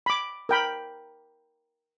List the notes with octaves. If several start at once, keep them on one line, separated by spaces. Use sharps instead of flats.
B5 D6
A#4 G5 B5